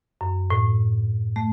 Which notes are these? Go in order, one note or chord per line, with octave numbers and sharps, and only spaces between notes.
F#2
A2
A3